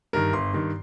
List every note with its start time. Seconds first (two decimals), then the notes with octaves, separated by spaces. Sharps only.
0.13 G2 D#3 A#4
0.33 G1 C6
0.53 G2 D#3